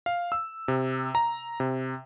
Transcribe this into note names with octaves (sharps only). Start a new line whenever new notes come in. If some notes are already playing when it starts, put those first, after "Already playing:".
F5
E6
C3
A#5
C3